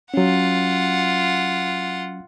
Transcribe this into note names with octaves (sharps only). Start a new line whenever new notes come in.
F#3 C#4 F4 F#5